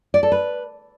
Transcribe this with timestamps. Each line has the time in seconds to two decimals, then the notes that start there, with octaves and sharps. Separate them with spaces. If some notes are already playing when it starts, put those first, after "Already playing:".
0.14 D5
0.23 A4
0.32 B4